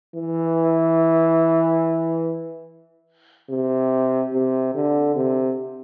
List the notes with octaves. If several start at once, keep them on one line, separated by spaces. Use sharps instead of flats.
E3
C3
C3
D3
C3